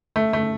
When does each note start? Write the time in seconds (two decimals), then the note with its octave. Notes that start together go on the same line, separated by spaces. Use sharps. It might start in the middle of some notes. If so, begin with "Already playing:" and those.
0.16 A3
0.33 A3